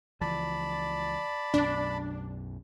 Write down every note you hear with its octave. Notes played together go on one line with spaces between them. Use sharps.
C#2 E3 F3 D5 A5 B5
B1 F#2 B2 D4